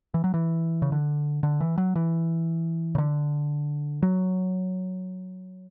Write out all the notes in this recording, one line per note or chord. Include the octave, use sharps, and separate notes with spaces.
E3
F#3
E3
C#3
D3
D3
E3
F#3
E3
C#3
D3
F#3